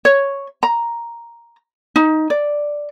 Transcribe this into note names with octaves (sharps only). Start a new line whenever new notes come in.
C#5
A#5
D#4
D5